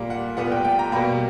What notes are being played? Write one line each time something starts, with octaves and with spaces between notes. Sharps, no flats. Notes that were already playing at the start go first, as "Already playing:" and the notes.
Already playing: A#2 G3 A#3
F#5
A#2 G3 B3 F#5
G5
G5
A#5
B2 G3 A#3 B5